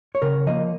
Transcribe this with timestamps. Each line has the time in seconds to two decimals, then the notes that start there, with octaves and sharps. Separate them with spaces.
0.15 C#5
0.22 C#3 A#4
0.47 F3 A#3 D#5